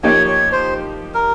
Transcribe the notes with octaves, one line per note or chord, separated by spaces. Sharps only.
F3 A#3 D#4 G4 C#5
C#5
C5
A#4